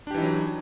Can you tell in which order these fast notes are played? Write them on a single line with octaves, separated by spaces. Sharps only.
D4 G4 E3 D#4 F#3